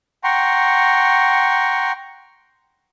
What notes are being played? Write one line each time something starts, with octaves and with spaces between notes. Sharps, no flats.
F#5 G5 A#5 C6 C#6